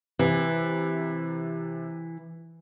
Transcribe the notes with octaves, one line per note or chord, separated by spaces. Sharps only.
C3 E3